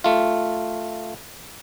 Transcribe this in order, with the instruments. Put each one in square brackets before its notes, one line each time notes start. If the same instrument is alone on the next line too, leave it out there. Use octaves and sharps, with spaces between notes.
[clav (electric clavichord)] A3 F4